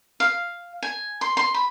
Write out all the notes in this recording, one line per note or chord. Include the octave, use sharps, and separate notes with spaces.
F5
G#5
C6
C6
B5